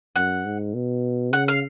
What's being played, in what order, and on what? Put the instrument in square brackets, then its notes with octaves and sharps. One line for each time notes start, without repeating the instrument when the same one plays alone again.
[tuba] F#2 [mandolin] F#5
[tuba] G#2
B2
[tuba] C#3 [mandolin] F#5
[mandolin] F5